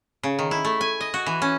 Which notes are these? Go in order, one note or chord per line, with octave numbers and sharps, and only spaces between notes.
C#3
D#3
E4
A3
G#5
D#5
F#4
E3
C#4